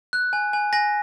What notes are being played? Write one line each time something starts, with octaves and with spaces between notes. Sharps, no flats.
F#6
G#5
G#5
G#5 A#6